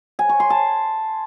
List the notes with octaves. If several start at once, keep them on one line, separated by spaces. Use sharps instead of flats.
G#5
C#6
C6
A5